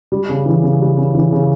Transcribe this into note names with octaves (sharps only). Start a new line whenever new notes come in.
G3
C#3
E3
C#3
G3
C#3
E3
C#3